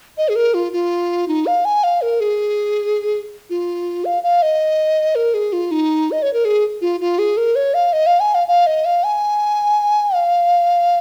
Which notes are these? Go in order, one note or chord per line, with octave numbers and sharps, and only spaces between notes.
D#5
G#4
A#4
F4
F4
D#4
F5
G#5
F5
A#4
G#4
F4
F5
F5
D#5
A#4
G#4
F4
D#4
D#5
C#5
A#4
G#4
F4
F4
G#4
A#4
C#5
F5
D#5
F5
G#5
F5
F5
D#5
F5
G#5
F5